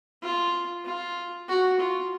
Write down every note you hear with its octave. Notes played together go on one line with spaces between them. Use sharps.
F4
F4
F#4
F4